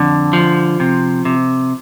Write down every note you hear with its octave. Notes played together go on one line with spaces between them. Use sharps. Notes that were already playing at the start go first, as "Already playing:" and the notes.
Already playing: F2 D3
F3
C3
C3